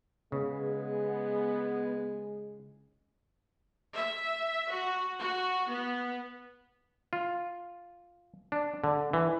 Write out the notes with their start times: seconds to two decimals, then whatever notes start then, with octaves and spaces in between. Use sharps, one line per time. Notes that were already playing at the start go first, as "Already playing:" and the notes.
0.32 C#3 G#3 B3
3.95 E5
4.70 F#4
5.20 F#4
5.70 B3
7.13 F4
8.52 D4
8.84 D3
9.13 E3